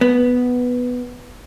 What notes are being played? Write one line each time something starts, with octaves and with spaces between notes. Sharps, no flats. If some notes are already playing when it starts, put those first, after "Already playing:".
B3